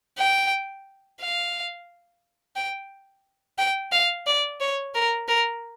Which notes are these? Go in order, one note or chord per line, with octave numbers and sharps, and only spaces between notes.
G5
F5
G5
G5
F5
D5
C#5
A#4
A#4